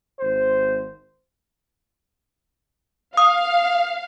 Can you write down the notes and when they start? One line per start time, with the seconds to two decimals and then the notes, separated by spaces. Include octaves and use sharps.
0.20 G#1 C5
3.17 F5 D#6